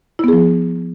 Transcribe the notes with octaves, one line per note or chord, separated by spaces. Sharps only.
F3 B3 E4 G#4